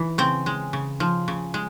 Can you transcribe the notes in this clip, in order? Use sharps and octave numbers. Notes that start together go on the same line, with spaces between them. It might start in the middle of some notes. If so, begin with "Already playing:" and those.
Already playing: E3
C#3 C4
G#3
C#3
F3
C#3
G#3